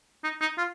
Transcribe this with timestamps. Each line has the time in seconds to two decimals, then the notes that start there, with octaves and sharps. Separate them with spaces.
0.24 D#4
0.41 D#4
0.58 F4